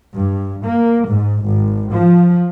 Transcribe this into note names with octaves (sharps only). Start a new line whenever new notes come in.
G2
A#3
G#2
G#1
F3